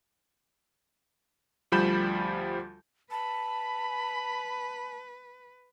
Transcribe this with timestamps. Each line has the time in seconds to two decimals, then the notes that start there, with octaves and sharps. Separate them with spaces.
1.72 D2 F3 G3 B5 G6 E7
3.11 B4 A5 B5